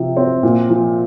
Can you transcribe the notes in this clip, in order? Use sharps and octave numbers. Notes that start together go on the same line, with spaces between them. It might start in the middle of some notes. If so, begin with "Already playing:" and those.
Already playing: C3 F3
C4
A#2
F3